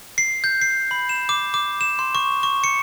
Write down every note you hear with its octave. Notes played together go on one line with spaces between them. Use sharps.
C7
G6
C7
B5
E7
D6
D6
E7
C6
C#6
C#6
C#7